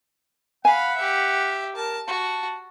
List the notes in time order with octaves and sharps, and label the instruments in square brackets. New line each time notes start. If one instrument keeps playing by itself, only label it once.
[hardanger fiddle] F5 B5 [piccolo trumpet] F#5 [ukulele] G#5
[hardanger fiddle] G4 E5
[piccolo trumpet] A#4 [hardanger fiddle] A5
[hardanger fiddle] F#4 [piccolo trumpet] A5